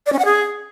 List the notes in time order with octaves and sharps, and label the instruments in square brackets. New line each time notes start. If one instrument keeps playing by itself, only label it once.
[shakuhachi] D5
C#4
F#5
G#4